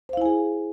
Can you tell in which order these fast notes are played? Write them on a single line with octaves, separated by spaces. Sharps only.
C5 F5 E4 G#5 G#4